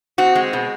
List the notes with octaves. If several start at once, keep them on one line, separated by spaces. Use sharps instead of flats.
C4 F#4
G#3
B2